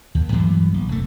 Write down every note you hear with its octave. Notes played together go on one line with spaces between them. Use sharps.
D#2
G2 E3 F#3 B3
A#1
F1 A3